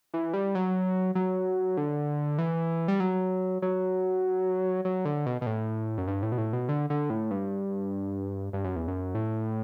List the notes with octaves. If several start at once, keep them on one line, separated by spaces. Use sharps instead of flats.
E3
G3
F#3
F#3
D3
E3
G3
F#3
F#3
F#3
D3
B2
B2
A2
F#2
G2
A2
B2
A2
B2
D3
D3
A2
G2
G2
F#2
E2
F#2
A2